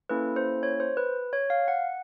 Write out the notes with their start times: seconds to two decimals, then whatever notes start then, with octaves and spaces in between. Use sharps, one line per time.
0.09 A#3 C#4 E4 A4 B4
0.36 C5
0.63 C#5
0.80 C5
0.97 B4
1.33 C#5
1.50 F5
1.68 F#5